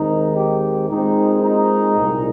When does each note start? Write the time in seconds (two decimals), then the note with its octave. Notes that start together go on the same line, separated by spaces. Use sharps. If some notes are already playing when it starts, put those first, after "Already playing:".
Already playing: D#2 D#3 G#3 C4 D#4
0.36 G4
0.89 A#2 G#3 C4 D#4
1.43 D#4
1.97 C2 A#2 G#3